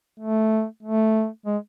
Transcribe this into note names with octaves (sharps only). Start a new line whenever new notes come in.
A3
A3
G#3